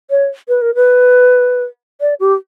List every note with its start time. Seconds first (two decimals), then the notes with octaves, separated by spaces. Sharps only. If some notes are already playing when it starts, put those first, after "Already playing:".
0.10 C#5
0.48 B4
0.62 A#4
0.75 B4
2.01 D5
2.20 G4